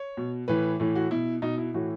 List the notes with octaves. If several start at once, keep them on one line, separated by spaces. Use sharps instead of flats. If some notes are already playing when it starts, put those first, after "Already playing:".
Already playing: C#5
B2
A2 E3 B4
A2 E3
F#4
B2 E4
B2 D#4
E4
A2 E3 F#4